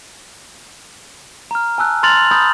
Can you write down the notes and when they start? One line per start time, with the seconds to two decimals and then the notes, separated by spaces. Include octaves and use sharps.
1.51 A#5 F6
1.78 G#5 A5 E6 F#6
2.03 A#5 C6 F6 A6 F7 F#7
2.31 A#5 B5 D#6 G6 A6